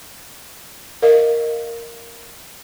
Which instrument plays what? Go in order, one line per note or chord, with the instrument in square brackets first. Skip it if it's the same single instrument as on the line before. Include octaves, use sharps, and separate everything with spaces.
[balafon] A#4 D#5 F5